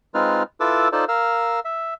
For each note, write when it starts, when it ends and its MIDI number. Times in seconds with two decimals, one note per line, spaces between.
0.14 0.43 56
0.14 0.43 60
0.14 0.43 63
0.14 0.43 65
0.14 0.43 71
0.14 0.43 89
0.60 0.88 64
0.60 0.88 65
0.60 0.88 69
0.60 0.88 71
0.60 0.88 86
0.60 0.88 88
0.92 1.05 63
0.92 1.05 65
0.92 1.05 69
0.92 1.05 72
0.92 1.05 74
0.92 1.05 81
1.08 1.60 70
1.08 1.60 77
1.08 1.60 88
1.65 1.94 76